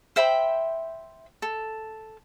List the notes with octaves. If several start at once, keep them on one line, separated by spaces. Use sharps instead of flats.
C5 E5 G5 B5
A4